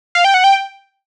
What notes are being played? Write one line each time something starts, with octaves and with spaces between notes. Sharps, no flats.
F5
G5
F#5
G5